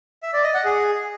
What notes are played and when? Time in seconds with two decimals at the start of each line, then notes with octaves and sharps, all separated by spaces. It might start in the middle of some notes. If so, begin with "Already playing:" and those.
0.23 E5
0.33 D5
0.44 D#5
0.54 F#5
0.65 G#4